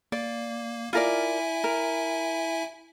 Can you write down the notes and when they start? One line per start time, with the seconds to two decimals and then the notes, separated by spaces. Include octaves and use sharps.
0.12 A#3 D5
0.93 E4 F4 A#4 D5 E5 G#5
1.64 A#4